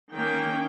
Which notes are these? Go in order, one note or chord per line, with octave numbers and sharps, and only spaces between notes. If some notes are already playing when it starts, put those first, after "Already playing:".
D#3 A#3 C#4 G5